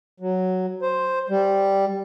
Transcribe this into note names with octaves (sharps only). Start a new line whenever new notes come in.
F#3
C5
G3